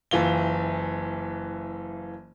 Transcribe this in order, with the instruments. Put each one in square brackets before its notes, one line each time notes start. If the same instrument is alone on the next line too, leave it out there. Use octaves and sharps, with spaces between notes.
[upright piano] F#1 E3 F4 G7